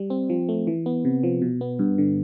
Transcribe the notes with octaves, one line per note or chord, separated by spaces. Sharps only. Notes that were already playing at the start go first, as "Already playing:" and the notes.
Already playing: G3
C4
F3
A3
E3
B3
C3
F3
B2
B3
G2
D3